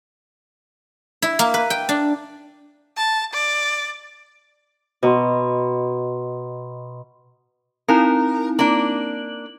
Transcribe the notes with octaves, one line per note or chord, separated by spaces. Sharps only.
E4
A#3
B4
G5
D4
A5
D5
B2 D#5 A#5 C6
C4 D#4 E4 A#4
A#3 D4 F#7